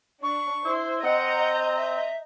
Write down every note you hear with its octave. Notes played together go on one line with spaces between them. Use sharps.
D4 C#6
E4 C5
C4 D#5 F#5 A#5 G6
E5